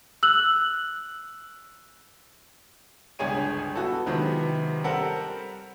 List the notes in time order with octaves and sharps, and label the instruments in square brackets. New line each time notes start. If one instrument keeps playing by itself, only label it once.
[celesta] E6 F#6 F#7
[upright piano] G1 C#2 D4 G#4 C#5 D#7
B3 F#4 A4
C3 D#3 F3 F#3 G#3 B3
G3 C4 A4 A#4 F#5